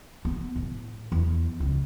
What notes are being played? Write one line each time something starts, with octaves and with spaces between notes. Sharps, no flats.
B3
A2
E2
C#2